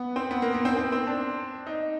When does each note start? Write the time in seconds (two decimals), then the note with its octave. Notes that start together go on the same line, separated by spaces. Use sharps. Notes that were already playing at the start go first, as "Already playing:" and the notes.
Already playing: B3
0.16 C4
0.31 B3
0.42 A#3
0.54 B3
0.65 C4
0.77 C4
0.92 C4
1.07 D4
1.67 D#4